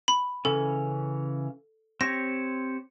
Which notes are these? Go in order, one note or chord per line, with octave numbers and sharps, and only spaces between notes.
B5
C#3 E3 C#4 A4
C4 G4 C#5 A#6